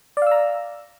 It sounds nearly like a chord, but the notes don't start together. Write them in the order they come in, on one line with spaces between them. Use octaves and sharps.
D5 F5 E6 A#5